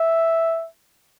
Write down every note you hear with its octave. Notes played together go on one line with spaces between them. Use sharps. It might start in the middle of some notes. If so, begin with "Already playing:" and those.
Already playing: E5